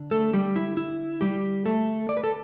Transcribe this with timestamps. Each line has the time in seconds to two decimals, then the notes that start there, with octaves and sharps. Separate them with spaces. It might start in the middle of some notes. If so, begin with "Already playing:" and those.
Already playing: D3 D4
0.11 A3 A4
0.33 G3 G4
0.56 E4
0.77 E4
1.21 G3 G4
1.66 A3 A4
2.09 D5
2.17 B4
2.24 A4